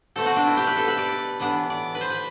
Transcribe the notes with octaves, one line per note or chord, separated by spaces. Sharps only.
B2 A3 C4 A4
F#4
D4
E4
G4
B4
A4
B4
D5
A2 E3 B3 D4
D5
B4
C5
B4